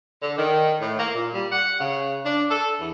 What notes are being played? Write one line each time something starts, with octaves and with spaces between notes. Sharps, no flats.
D3
D#3
A2
A#3
A#2
G3
F#5
C#3
D4
A4
E2